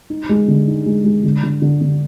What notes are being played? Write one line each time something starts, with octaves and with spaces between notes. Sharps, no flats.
D#4
G#3
D3
D#4
G#3
G#3
D3
D3
D3
D3